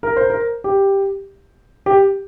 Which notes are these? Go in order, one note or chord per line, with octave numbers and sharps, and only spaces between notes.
A#4
C5
A#4
G4
G4